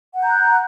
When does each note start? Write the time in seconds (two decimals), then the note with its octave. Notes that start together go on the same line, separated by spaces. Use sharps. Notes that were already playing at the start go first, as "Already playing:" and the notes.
0.15 F#5
0.19 G6
0.23 A#5
0.27 F#6